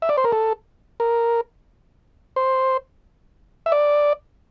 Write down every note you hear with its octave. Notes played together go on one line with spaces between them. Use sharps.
E5
D5
C5
A#4
A4
A#4
C5
E5
D5